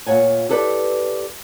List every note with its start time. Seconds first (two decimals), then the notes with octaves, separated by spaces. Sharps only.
0.06 A#2 F4 A#4 C#5 F#5 G#5
0.49 E4 G4 A4 B4 C5 D5